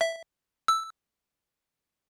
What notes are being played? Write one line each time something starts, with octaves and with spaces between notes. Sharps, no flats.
E5
E6